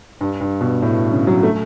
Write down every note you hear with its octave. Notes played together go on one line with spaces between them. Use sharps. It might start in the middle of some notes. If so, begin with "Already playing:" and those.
G2
G2
B2
A2
C#3
F#3
A3